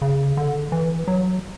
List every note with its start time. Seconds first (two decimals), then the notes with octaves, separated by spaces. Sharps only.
0.02 C#3
0.37 D3
0.72 E3
1.08 F#3